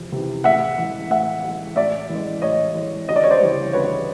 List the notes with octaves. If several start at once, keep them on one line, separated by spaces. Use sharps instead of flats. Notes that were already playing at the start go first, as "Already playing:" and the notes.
Already playing: F2 C3 E3
C3 E3
A2 E5 F#5
E3 G#3
A2 E5 F#5
E3 G#3
A2 D5 E5
E3 G#3
A2 C#5 D#5
E3 G#3
D2 D#5
D5
C#5
C5 D5
C#3 E3 G3
D2 B4 C#5